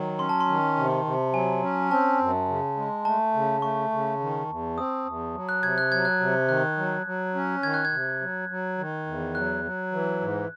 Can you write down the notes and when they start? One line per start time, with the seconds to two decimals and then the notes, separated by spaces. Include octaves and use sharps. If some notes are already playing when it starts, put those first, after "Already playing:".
Already playing: D#3 F#3
0.19 C#4 C6
0.29 A5
0.41 C6
0.48 D#3
0.76 C3
1.05 C3
1.33 F#3 G#5
1.63 C#4
1.91 C4 A5
2.20 F#2
2.48 C#3
2.77 G#3
3.05 A3 A5
3.34 C#3
3.62 A3 C#6
3.92 C#3
4.20 D#3
4.49 E2
4.77 C4 D#6
5.05 E2
5.34 F#3
5.49 F#6
5.63 C3 G#6
5.78 F#6
5.91 F#3 G#6
6.05 F#6
6.20 C3
6.48 D#3 F#6
6.77 F#3
7.06 F#3
7.35 C#4
7.63 D#3 G#6
7.74 F#6
7.85 G#6
7.92 C3
8.21 F#3
8.49 F#3
8.78 D#3
9.06 E2
9.35 F#3 F#6
9.64 F#3
9.92 E3
10.21 G#2